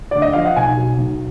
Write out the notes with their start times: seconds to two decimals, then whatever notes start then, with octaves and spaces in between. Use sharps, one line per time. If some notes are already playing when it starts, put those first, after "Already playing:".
0.11 D3 D5
0.22 D#5
0.33 F3 F5
0.45 F#5
0.56 B1 G#5
0.77 F#3
0.98 B1